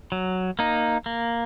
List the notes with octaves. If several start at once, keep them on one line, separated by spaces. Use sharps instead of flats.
F#3
A#3 D#4
A#3